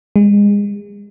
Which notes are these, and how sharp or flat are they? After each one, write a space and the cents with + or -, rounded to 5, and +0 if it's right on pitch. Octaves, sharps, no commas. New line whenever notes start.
G#3 -30